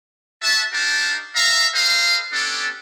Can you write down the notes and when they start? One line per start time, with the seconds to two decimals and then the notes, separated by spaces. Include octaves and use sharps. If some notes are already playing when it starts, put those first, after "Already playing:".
0.42 F#4 E5 A5
0.73 D4 D#4 G4 A#4 F5 A5
1.36 E5 F5 A#5
1.75 A4 B4 C5 D#5 F5
2.33 B3 C#4 D4 G4 A4